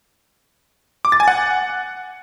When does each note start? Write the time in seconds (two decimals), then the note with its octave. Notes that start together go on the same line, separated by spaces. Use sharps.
1.05 D6
1.12 A6
1.20 G#5
1.28 F#5